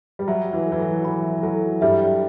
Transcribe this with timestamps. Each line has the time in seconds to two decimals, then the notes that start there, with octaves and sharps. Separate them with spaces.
0.19 G3
0.28 F#3 E5
0.53 E3
0.66 A4
0.72 E3
0.79 F#3
1.05 E3 B5
1.43 F#3 A4
1.81 G2 G3 E5